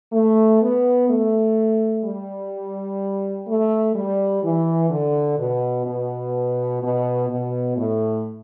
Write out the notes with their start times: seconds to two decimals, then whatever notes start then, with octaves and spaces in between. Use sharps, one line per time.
0.13 A3
0.62 B3
1.09 A3
2.04 G3
3.47 A3
3.95 G3
4.43 E3
4.90 D3
5.39 B2
5.86 B2
6.82 B2
7.30 B2
7.77 A2